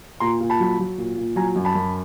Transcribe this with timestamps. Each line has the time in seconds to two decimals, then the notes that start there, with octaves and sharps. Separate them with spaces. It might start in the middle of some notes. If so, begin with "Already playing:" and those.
0.20 A#2 A#5 C6
0.40 A#2
0.50 A5 B5
0.60 F#3
0.79 F#3
0.98 A#2
1.17 A#2
1.36 F#3 G#5 A#5
1.56 F#2
1.65 A5 B5
1.75 F#2